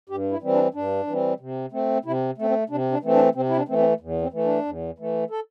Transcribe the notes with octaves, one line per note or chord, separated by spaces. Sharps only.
G2 G4
E4
E3 G3 C4
D4
G2 D4
E3 G3 C4
C3
A3 C4
C3 E4
A3 C4
C4
C3 D4
D4
E3 A3 C4
D4
C3 C4
E4
D4
E3 A3 C4
C4
E2
C4
E3 A3
D4
E2
E3 A3
A4